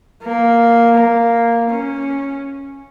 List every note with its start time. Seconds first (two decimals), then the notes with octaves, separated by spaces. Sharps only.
0.22 A#3
0.95 A#3
1.69 C#4